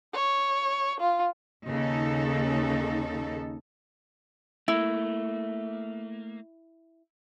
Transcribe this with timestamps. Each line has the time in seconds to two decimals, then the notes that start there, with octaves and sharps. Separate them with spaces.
0.14 C#5
1.00 F4
1.67 D#2 C#3 D#4 A4
4.68 A3 A#3 E4